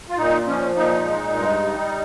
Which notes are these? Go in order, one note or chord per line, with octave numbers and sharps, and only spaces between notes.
F4
A#2 D#4
F3 C#4
A#2 D#4
G#3
G2
G3